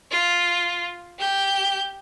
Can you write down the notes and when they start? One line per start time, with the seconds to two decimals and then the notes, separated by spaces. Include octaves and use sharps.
0.11 F4
1.19 G4 G6